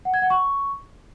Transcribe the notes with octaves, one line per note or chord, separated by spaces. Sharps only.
F#5
G#6
F#5
C#6